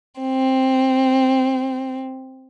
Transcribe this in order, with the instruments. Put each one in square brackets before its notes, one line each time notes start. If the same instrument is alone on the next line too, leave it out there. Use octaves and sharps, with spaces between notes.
[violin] C4